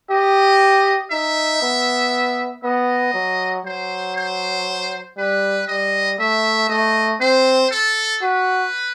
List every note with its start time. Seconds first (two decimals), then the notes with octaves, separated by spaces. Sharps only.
0.10 G4 D#5
1.11 D#4 E5
1.62 B3
2.64 B3 D#5
3.14 F#3
3.65 F#3 C5
4.16 C5
5.17 G3 B4
5.68 G3 D#5
6.19 A3 E5
6.69 A3 D#5
7.21 C4 C5
7.71 A4
8.22 F#4 B4